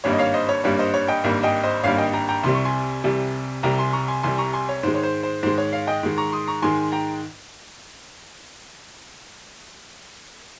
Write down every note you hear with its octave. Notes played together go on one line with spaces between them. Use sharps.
G#1 G2 G3 A#3 C#5
D#5
C#5 F5
C5 D#5
C#5
G#1 G2 G3 A#3 C#5
C5 D#5
C#5
D#5 G5
G#1 G2 G3 A#3
D#5 G5
C5 D#5
G#1 G2 G3 A#3 C#5 F5
D#5 G5
G5 A#5
G5 A#5
C2 C3 G3 C6
C#6
G#5 C6
C2 C3 G3
C2 C3 G3 G5 A#5
G#5 C6
A#5 C#6
G#5 C6
C2 C3 G3 G#5 C6
A#5 C#6
G#5 C6
C#5
G#2 D#3 G#3 C5
C#5
C5
C5
G#2 D#3 G#3 C5
C#5
C#5 F5
D#5 G5
G#2 D#3 G#3
A#5 C#6
C6 D#6
A#5 C#6
G#2 D#3 G#3 G#5 C6
G5 A#5